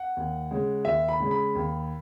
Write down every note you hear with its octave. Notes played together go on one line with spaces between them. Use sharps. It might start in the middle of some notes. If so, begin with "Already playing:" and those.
Already playing: F#5
D#2
C#3 G#3 C#4
D#2 E5
B5
C#3 G#3 C#4
B5
D#2